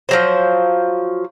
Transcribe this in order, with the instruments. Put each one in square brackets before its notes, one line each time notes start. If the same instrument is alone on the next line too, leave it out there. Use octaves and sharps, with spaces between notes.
[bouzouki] F3 F#3 C5